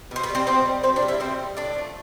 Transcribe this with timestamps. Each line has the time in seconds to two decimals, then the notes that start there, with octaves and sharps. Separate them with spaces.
0.11 B2 C5
0.23 B3 B4
0.29 G3
0.35 C4 C5
0.47 B2 C4 C5
0.65 G3
0.83 B2 C4 C5
0.96 D4 D5
1.02 G3
1.08 E4 E5
1.20 B2 C4 C5
1.39 G3
1.57 A2 D4 D5
1.75 F3 A3